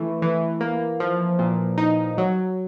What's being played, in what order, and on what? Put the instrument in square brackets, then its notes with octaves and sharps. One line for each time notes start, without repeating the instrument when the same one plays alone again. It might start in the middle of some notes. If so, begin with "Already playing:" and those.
Already playing: [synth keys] E3 A3
E3
A#3
F3
A#2
D#4
F#3